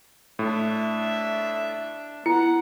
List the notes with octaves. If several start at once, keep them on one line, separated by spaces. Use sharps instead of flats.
A2 D4 E5
B3 E4 F#5 C#7